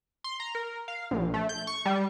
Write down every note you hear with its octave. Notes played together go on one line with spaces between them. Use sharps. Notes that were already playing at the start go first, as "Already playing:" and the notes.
C6
A#5
A#4
F5
A#1
A3
G6
C#6
G3